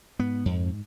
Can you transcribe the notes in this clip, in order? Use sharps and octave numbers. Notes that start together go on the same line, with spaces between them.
G#2 B3
F2